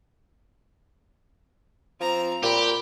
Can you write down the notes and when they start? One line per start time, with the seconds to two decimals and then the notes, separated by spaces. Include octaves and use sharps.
2.01 F3 C4 A#5
2.43 A#2 G4 B5